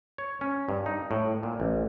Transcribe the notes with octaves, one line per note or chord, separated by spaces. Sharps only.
C#5
C#4
G2
D#4
A2
A#2
A1